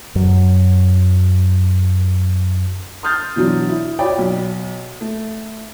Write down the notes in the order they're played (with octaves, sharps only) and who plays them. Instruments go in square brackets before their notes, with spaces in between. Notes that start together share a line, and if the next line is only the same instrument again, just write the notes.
[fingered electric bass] F#2 F#3
[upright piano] C6 D#6 F6 G6 A6
B2 E3 F#3 D4
E4
F4 F#4 C#5 D5 G5 B5
B1
A3